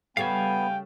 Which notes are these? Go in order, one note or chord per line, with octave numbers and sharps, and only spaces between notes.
C#3 G3 A3 B3 F5 G5 G#5